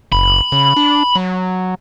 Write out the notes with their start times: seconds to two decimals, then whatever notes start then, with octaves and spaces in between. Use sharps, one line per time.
0.12 F#1 B5
0.52 C#3
0.77 D4
1.15 F#3